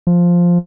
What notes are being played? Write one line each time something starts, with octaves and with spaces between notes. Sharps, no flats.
F3